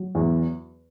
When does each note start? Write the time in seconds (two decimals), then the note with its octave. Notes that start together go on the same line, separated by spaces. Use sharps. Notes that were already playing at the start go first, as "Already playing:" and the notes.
Already playing: F#3
0.15 E2